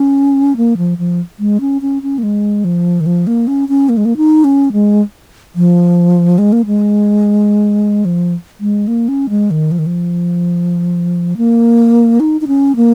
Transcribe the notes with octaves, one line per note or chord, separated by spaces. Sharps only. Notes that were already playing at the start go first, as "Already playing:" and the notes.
Already playing: C#4
A#3
F3
F3
G#3
C#4
C#4
C#4
A#3
G#3
F3
D#3
F3
A#3
C#4
C#4
A#3
G#3
A#3
D#4
C#4
G#3
F3
G#3
A#3
G#3
F3
G#3
A#3
C#4
G#3
D#3
F3
D#3
F3
A#3
D#4
D#4
C#4
A#3